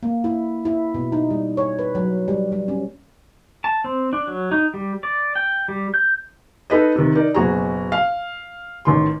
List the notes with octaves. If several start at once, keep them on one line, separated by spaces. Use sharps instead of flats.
A#3
E4
E4
B2
D#4
G3
C#5
B4
F#3
G3
G3
C#4
A5
C4
D4
F#3
D#4
G3
D5
G5
G3
G6
D#4 A4 B4 D#5
C3 D#3
D#4 A#4 D5
F#1 B2 F#4 G#4 A#5
F5
A1 D#3 C6